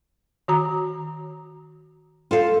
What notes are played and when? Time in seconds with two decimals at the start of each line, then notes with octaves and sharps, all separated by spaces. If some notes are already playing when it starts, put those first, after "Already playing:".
0.48 D#3 F#4 A#5
2.31 F4 A4 F5